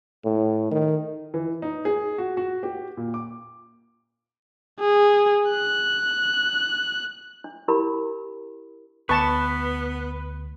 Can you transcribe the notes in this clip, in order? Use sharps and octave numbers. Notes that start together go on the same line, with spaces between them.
A2
D#3
E3
D#4
G#4
F#4
F#4
G4
A#2
D6
G#4
F#6
D4
D4 E4 G4 A#4 B5
D2 B3 B4 A5 C#6